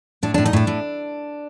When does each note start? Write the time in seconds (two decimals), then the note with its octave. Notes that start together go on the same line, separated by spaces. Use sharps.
0.23 A2 D4
0.34 A2 D4
0.46 D#4
0.53 A2 D4
0.67 A2